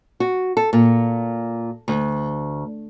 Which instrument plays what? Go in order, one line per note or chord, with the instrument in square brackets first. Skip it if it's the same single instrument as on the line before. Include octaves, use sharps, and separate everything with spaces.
[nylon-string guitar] F#4
A4
A#2
D2